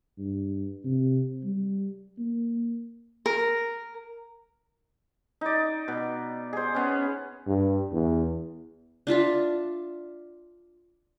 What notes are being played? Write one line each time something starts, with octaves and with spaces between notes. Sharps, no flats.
G2
C3
G3
A#3
A#4
D#4 D5
B2
G#4 C5
B3 C#4
G2
E2
D4 F4 E5 A5